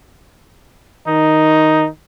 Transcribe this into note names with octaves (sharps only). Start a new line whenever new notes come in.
D#3 D#4